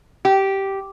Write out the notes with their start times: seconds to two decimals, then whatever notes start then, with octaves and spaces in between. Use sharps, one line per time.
0.25 G4